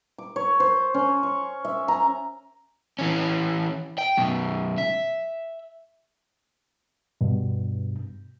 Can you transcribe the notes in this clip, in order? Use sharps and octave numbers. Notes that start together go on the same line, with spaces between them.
D6
C#5
C5
C#4
C#6
E5
A#5
E3 C#4
G5
F#2 B2
E5
G2 B2